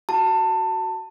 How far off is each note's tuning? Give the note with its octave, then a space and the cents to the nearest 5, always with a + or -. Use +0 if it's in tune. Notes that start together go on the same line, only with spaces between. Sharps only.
F#4 +15 A5 +20